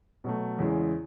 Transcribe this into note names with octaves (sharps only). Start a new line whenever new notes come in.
B2 F#3 A3
E2 C#3 E3 G#3